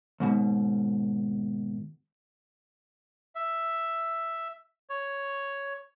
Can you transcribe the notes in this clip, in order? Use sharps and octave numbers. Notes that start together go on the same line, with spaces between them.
D#2 G#2 B2
E5
C#5